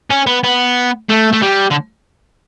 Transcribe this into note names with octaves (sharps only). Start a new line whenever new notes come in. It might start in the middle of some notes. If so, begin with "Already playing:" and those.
C#4
B3
B3
A3
A3
G3
D3